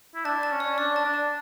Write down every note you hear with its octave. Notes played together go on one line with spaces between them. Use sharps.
E4
D4 A5
A5
C#4
D5
D4 D5
A5
D4
A5